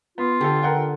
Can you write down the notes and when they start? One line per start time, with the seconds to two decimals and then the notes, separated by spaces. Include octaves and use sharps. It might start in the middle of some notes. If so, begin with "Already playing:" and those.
0.18 B3 F4
0.41 D3 G4 A4
0.63 A#4 F#5 G5